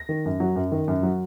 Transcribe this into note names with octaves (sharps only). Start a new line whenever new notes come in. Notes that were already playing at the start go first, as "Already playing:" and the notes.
Already playing: A#6
D#3
F#2
F#3
F#2
D#3
F#2
F#3